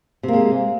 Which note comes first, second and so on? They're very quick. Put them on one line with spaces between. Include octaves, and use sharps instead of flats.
C3 A#3 G#3